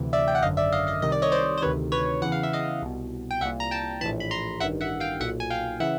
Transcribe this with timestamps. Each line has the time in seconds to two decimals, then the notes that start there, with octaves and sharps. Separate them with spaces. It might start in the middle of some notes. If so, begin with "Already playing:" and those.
Already playing: D2 C3 E3
0.13 D5 E5
0.28 G5
0.35 F#5
0.42 G#1 F#2 D3 D#5 F5
0.57 D5 E5
0.72 D#5 F5
0.87 D#5 F5
1.02 C2 C3 D#3 D#5
1.12 D5
1.22 C#5 D#5
1.32 C5 D5
1.58 C5
1.62 D2 C3 D#3 B4 C#5
1.92 B4 C#5
2.22 E2 C#3 E3 F#5
2.32 F5
2.43 E5
2.53 D#5 F5
2.82 C2 B2
3.31 G5
3.41 C2 A#2 E5 F#5
3.60 A#5
3.71 G5 A5
4.01 A#1 A2 E3 A5 B5
4.20 B5
4.31 A#5 C6
4.60 A1 G2 D#3 E5 F#5
4.81 E5 F#5
5.00 F5 G5
5.20 B1 A#2 E5 F#5
5.40 G#5
5.50 F5 G5
5.80 C#3 E3 E5 F#5